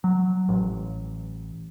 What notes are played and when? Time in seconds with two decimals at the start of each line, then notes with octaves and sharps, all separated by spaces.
0.04 F#3
0.49 A1